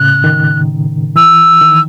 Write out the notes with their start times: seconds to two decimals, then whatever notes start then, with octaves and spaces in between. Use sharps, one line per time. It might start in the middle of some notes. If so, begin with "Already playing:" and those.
Already playing: A2 C#3 F#6
0.24 D#3
1.16 E3 E6
1.61 D#3